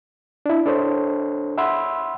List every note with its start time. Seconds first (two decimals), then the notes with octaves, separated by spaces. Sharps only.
0.46 D4 E4
0.66 D4 A4 C5 C#5
1.58 E5 F#5 B5 C6 E6